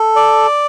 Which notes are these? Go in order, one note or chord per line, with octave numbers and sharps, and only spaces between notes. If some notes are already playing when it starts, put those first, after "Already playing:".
Already playing: A4
D5